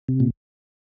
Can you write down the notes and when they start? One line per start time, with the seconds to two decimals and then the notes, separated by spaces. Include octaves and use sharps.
0.09 C3
0.20 A#2